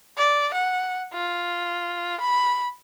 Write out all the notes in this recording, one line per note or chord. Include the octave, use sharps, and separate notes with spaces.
D5
F#5
F4
B5